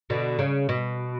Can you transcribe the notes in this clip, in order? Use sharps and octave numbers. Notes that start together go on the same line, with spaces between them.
B2 D3
C#3
B2